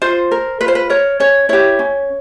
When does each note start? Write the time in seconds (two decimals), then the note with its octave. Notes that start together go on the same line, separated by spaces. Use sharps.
0.02 F4 C5
0.31 A#4
0.61 F4 B4
0.68 C5
0.75 B4
0.90 A#4 C#5
1.20 C#4 C#5
1.49 E4 G4 C#5
1.79 C#4